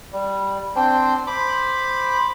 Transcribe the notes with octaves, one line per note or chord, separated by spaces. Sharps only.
G3
C4 D4 C5 G5
C5 B5 D6